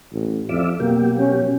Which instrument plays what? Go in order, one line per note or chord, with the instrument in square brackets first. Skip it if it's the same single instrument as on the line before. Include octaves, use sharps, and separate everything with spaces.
[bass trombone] A1
[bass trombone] F2 [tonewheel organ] F4 D5 E5
[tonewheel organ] B2 F#3 G4 [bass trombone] A#3
[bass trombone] C#4